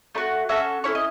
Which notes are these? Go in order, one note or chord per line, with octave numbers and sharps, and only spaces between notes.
A3 D#4 F#4
C#4 F#4 A4 E5
C#4 E4 A4 C#5
D#5